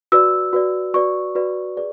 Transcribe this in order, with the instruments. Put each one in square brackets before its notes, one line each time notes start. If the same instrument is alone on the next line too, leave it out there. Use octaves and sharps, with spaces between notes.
[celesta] F#4 B4 D5 E6
F#4 B4 D5
F#4 B4 D5 C#6
F#4 B4 D5
G#4 B4 D5